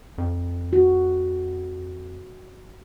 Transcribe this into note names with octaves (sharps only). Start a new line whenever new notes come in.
F2
F#4